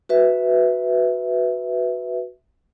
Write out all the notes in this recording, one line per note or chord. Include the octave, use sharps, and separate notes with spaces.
F#4 B4 E5